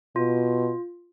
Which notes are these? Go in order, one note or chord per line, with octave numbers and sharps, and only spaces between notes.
B2 F4